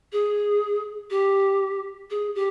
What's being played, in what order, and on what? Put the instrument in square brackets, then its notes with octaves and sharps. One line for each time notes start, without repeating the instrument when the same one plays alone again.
[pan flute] G#4
G4
G#4
G4